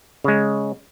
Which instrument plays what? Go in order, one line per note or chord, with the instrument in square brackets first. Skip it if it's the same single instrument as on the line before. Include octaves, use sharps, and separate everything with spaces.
[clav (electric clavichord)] C#3 G#3